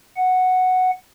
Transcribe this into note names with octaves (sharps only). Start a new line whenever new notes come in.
F#5